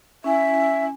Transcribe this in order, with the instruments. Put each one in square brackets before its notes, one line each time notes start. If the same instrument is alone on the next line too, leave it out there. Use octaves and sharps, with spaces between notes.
[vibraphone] C#4 E4 G#5 [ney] E5